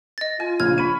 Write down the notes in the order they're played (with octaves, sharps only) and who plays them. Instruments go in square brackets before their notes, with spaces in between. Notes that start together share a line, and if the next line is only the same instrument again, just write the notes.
[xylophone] D#5 A6
[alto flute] F4 [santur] G#5
[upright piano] A#1 C#3 F6 [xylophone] G#6
[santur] C#5 B5 [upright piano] D#7